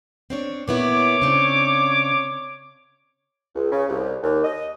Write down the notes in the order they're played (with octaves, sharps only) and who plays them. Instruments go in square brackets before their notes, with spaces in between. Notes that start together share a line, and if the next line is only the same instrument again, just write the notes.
[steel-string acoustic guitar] C4 D4 C#5
[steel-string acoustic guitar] A#2 B3 E4 [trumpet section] C#5 D6
[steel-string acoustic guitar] C#3 C4 D4
[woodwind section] C#2
C#3
C2
D#2
D#5